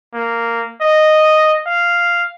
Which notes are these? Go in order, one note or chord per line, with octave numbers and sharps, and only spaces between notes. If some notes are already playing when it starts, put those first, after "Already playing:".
A#3
D#5
F5